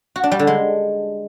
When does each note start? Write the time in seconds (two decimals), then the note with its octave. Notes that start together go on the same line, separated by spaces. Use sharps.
0.16 F#4
0.24 D4
0.31 G3
0.39 D3
0.47 G#3